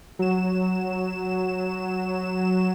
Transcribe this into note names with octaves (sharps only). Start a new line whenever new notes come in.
F#3 E7